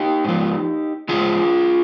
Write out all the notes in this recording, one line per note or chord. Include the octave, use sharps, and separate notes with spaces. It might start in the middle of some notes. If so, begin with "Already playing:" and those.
Already playing: D#4 G4
G#2 F3
G#2 D#3 F4 G#4